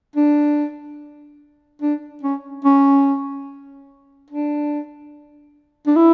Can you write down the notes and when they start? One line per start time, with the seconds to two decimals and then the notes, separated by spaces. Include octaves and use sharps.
0.16 D4
1.82 D4
2.23 C#4
2.65 C#4
4.30 D4
5.87 D4
5.96 E4